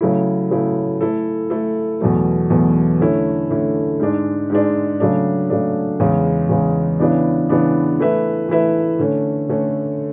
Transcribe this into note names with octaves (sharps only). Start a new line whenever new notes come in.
C#3 F#3 A3 E4
C#3 F#3 A3 E4
A3 E4 A4
A3 E4 A4
E2 B2 F#3 A3
E2 B2 F#3 A3
D3 A3 C#4 E4
D3 A3 C#4 E4
G#2 G#3 D4
G#2 G#3 D4
C#3 F#3 A3 D4
C#3 F#3 A3 D4
E2 C#3 G#3
E2 C#3 G#3
C#3 E3 B3 D4
C#3 E3 B3 D4
E3 A3 E4 B4 E5
E3 A3 E4 B4 E5
D3 A3 C#4
D3 A3 C#4